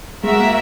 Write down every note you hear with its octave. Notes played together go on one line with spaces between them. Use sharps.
G#3 F#4 A#4 E5
A#3